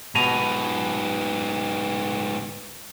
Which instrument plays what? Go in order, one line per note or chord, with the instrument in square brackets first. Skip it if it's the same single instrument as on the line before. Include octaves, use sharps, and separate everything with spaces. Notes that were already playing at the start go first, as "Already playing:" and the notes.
[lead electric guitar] G#2 B3 [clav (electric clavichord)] B2 G#5 A#5